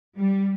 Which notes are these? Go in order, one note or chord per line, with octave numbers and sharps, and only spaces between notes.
G3